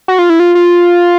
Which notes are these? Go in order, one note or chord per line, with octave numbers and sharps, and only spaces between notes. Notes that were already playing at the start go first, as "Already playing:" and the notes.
F#4
F4
E4
F4
F4